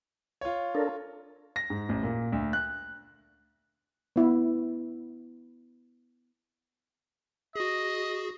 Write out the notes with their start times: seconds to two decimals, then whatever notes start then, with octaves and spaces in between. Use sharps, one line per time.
0.41 F4 C#5
0.75 D4 A4 A#4
1.56 A#6
1.70 G#2
1.89 A1
2.03 A#2
2.32 D2
2.53 F#6
4.16 B3 E4
7.56 F#4 G#4 D#5